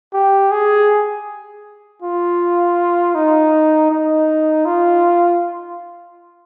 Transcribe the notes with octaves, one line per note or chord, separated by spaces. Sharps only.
G4
G#4
F4
D#4
D#4
F4